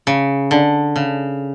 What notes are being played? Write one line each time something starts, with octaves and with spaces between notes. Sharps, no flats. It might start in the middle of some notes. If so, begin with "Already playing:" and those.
C#3
D3
C#3